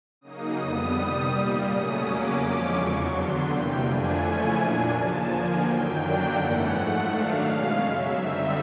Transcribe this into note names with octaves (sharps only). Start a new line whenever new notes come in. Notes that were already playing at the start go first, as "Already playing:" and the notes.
C#3 F#3 A#3 D#4 D#6
F2 D3 G3 B3 D#6
C3 D#3 G3
A#2 G3 A#3
C#3 F#3 A3 C#4 D#6
E2 C#3 F#3 A#3 C#4 D6
F2 D3 F3 G#3 C#4
E2 C#3 F#3 C#6
D3 F#3 B3 D4 C6
C3 E3 G3 A#3 G5
F2 D3 F3 A3 D4 G#5
C#3 F3 A3 C#4 E4
A#2 F#3 A#3 D4 G#5
D#2 C#3 F3 A5
D3 F3 A#3 G#5
F#2 D#3 F#3 G5
F#2 D3 F#3 A#3 D4
G#2 E3 A3 C#4 F#5
G#2 F3 A3
D#3 F#3 A3 D4 F5
B2 G#3 C#4
F#2 C#3 F#3 E5
D3 G3 C4 D#4